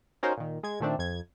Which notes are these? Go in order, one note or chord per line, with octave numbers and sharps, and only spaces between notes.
C#4 D#4 F#4 A#4 C5
A#2 D#3
G#3 G#6
A#2 D#3 A3 C4 D4
F2 G#6